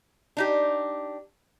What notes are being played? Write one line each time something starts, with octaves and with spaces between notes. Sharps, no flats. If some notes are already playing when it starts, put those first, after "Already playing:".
D4 D#4 G4